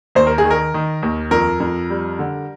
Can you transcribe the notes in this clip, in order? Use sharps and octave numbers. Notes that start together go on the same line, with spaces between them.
D#2 C5
A#4
G#4
D#3
A#4
D#3
D#2
F2 A#4
F2
G3
D3